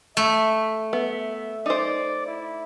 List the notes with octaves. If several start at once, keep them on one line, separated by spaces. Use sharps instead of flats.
A3 E5
B3 E5
D#4 C5 D5
E4